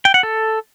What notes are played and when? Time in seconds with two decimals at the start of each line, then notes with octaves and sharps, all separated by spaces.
0.05 G5
0.14 F#5
0.23 A4